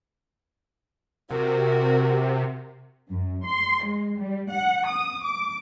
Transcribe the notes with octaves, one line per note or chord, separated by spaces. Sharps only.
C3 F#4 A#4
F#2
C6
G#3
G3
F#5
D#6
D6